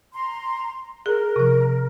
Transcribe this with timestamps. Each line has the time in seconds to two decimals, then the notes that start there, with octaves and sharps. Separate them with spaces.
0.14 A#5 C6
1.06 G#4 A#4
1.36 C3 F3